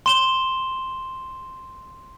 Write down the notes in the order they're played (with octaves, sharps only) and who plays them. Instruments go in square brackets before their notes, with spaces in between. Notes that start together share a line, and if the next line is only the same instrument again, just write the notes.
[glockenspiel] C6 E7 G7